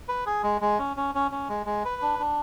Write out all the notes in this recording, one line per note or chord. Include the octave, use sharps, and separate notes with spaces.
B4
G#4
G#3
G#3
C#4
C#4
C#4
C#4
G#3
G#3
B4
D4
D4